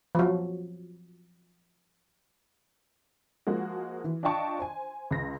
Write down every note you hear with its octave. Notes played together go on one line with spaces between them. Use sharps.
F3 F#3
F3 G#3 A#3 F#4
E3
D4 F4 D#5 G5 A5 C#6
C5 G#5
C#2 A#6